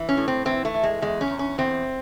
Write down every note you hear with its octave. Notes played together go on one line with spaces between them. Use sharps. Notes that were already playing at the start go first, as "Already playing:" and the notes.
Already playing: E3
C#4
A2
C4
E3 C4
A3
E3
G#3
E2 G#3
C#4
E2
C#4
E2 C4